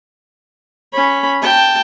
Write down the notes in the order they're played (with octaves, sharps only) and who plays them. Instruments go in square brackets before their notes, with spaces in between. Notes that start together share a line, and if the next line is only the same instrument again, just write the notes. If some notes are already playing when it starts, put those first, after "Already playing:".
[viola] C#4 B5
G5 A5